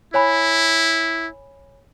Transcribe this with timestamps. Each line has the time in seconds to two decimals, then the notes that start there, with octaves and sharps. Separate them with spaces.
0.14 E4 C#5 G#5 B5